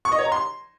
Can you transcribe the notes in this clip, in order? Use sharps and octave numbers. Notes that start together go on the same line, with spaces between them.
C#6
D#5
C#5
A#5
C6